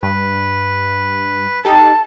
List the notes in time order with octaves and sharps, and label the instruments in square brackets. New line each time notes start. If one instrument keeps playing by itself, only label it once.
[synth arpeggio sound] G2 [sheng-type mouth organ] B4
[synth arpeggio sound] D#4 G4 A4 [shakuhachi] A5